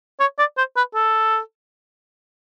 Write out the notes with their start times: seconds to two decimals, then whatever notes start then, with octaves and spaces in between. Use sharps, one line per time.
0.20 C#5
0.39 D5
0.57 C5
0.77 B4
0.95 A4